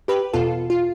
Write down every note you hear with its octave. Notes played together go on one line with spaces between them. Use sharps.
G4 B4
E2 B2 F4 A4
F4